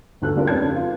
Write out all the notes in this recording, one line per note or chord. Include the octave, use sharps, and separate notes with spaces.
G1 D2 F#4 A4 F#6
F3 G3 C4 D4 A4 A#4
F2 C#3 B4 C#5 A5 G#6
C#4
F4